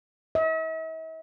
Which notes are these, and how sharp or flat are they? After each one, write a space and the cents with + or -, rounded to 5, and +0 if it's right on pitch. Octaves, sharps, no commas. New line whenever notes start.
E5 -45